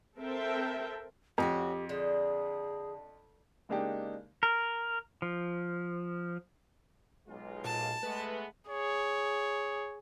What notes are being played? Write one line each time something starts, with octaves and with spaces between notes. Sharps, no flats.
C4 A4 A#4 E5 G5 A5
F2 C#4 D#4 F#4 G4
D3 G#4
C#3 G#3 A#3 D4 D#4 G4
A#4
F3
B1 G#3 F4
A#2 A5
G#3 A3 B3 B4
G#4 C#5